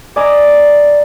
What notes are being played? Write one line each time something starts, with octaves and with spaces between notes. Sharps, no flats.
D5 E5 G#5 A#5 D6 D#6